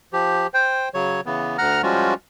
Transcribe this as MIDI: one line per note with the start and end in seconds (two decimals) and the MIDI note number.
0.13 0.47 53
0.13 0.47 67
0.54 0.89 72
0.54 0.89 79
0.94 1.21 49
0.94 1.21 54
0.94 1.21 73
1.26 1.57 49
1.26 1.57 52
1.26 1.57 59
1.58 1.82 38
1.58 1.82 78
1.58 1.82 82
1.58 1.82 89
1.83 2.14 53
1.83 2.14 55
1.83 2.14 56
1.83 2.14 61
1.83 2.14 65
1.83 2.14 66